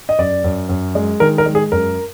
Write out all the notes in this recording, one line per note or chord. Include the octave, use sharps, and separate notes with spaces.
D#5
F#2 D5
F#2
F#2
G#3
D#3 A#4
A#4
G#3
G#4
F#2 A#4